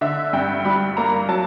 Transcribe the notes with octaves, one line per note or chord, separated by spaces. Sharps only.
D3 E5
G2 G5
G3 B5
A#3 A#5
F#3 A5